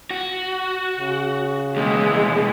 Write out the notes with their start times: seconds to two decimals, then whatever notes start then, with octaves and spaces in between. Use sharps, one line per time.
0.11 F#4
0.98 C#3
1.76 D#2 B2 E3 G#3